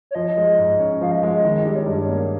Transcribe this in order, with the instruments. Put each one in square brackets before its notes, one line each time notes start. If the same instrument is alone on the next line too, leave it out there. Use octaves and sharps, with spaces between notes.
[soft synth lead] C#5
[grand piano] F3 [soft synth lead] D#5
[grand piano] G#3
G#2
C#4
[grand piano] F3 [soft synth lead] F5
[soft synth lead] D#5
[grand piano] G#3
[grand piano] D#3 [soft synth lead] D#5
[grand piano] G3
[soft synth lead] C#5
[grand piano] G2
A#3